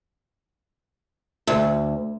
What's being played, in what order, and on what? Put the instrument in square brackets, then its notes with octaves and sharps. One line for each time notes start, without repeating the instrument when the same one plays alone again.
[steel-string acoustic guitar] D2